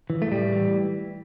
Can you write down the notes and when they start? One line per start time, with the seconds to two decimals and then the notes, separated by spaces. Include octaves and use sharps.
0.10 E3
0.22 A3
0.31 A2 G3
0.53 E3